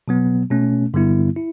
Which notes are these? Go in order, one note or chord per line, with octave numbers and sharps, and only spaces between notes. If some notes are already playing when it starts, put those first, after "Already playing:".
B2 F#3 B3
B2 A3 C#4
G2 D3 G3 B3 E4
E4